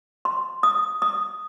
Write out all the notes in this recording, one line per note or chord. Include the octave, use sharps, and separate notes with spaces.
C6
D#6
D#6